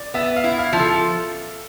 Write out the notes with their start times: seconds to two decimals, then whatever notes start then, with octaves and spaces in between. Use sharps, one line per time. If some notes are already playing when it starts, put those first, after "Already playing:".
Already playing: D5
0.14 B3 E5
0.36 F5
0.44 E4
0.59 F5
0.73 F3
0.79 A4